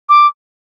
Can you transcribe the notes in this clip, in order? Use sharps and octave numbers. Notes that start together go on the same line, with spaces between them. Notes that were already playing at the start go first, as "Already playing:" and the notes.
D6